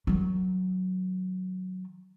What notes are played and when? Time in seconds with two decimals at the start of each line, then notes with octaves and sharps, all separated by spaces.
0.07 D#3 F#3